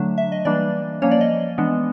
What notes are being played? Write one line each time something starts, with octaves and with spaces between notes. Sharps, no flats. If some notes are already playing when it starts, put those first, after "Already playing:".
Already playing: D3 F#3 A3 D4
E5
D#5
E3 G3 A#3 D4 D5
F3 A#3 C#4 C#5
D5
D#5
E3 G#3 B3 D4